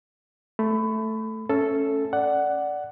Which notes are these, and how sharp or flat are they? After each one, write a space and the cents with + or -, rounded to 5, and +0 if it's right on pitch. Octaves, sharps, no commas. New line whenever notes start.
A3 +0 B5 +25
C#4 +0 A4 +0 E5 +5
D5 +0 F#5 +10